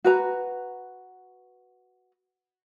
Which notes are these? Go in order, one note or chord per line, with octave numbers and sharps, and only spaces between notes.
F#4 B4 A#5